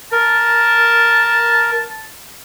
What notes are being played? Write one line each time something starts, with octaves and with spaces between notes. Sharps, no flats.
A#4 A5